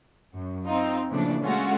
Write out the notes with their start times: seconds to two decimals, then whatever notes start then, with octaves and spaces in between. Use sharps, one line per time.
0.34 F#2
0.67 C4 D#4 F4
1.11 A#2 C#3 E3 F3 A3 D4
1.42 G#3 A3 C#4 F4 F#4